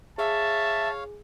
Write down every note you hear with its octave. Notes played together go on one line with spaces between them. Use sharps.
G#4 C#5 E5 F5 A5